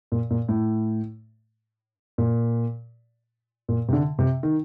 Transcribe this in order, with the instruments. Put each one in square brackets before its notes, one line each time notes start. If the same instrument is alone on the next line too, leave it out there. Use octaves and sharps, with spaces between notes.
[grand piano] A#2
A#2
A2
A#2
A#2
C3
D3
C3
D#3